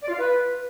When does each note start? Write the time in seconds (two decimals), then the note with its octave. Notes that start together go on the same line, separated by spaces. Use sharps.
0.03 D5
0.08 F4
0.13 F5
0.18 B4